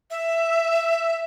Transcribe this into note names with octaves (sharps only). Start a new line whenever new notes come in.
E5